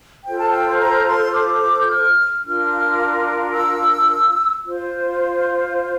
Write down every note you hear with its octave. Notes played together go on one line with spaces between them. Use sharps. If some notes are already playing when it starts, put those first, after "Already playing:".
F4 A4 C5 G5
A5
G5
A#5
C6
D6
G6
F6
D4 F4 A#4 F6
E6
F4 C5